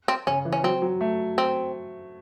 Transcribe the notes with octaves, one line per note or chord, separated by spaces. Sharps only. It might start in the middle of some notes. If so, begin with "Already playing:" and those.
C4
C#3 C#4
E3
C#4
F#3 C4
F#3
A3
C4